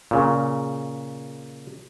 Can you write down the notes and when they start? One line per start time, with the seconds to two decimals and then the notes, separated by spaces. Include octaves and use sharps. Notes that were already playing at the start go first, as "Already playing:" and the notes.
0.11 A#2 C#3